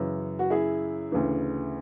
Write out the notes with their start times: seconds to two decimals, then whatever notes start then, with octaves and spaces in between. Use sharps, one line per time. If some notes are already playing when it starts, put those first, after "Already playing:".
Already playing: F#2 C#3 E3
0.39 F#4
0.50 E4 G#4
1.12 D2 C#3 E3